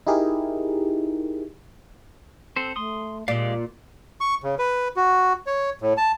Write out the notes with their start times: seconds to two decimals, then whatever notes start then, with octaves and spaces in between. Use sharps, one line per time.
0.07 D#4 E4 G4 G#4 A#4
2.56 C4 A4 C5
2.76 A3 C6 D#6
3.28 A#2 G#3 F4 G4 D5 F5
4.21 C#6
4.43 C#3
4.59 B4
4.96 F#4
5.47 C#5
5.81 A2
5.97 A5